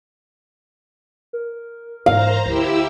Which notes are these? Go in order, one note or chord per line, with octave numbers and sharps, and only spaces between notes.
A#4
G#2 E3 C5 F5 A#5
D2 E4 G4 E6